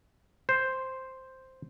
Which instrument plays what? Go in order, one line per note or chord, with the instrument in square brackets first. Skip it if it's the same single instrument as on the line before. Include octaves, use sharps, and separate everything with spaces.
[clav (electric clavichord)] C5